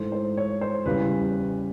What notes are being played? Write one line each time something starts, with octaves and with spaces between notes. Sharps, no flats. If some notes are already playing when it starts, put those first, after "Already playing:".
Already playing: G#2 E3 A3 C5
C5
C#5
C5
E2 C#3 E3 G3 B4